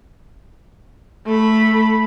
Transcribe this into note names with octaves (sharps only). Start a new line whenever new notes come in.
A3 B5